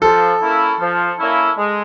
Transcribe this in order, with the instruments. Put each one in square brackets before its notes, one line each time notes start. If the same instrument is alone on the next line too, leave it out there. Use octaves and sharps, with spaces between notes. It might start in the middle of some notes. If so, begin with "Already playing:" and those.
[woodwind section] F3 [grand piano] A4
[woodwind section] A#3 C#4 E4
F3
A#3 C#4 E4
G#3